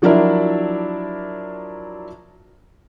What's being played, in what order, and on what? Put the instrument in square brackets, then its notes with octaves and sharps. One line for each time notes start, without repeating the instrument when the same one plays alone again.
[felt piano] F3 F#3 D4 E4 A#4 D5